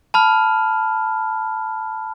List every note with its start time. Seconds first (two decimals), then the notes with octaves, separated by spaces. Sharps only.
0.14 A5 B5 F6